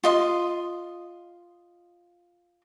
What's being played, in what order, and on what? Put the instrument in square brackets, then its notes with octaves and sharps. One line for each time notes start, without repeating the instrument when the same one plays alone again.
[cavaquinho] F4 D#5 C6